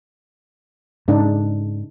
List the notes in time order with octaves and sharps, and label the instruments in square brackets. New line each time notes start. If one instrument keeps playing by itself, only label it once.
[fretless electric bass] G#2 [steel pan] C#3 D4 D#4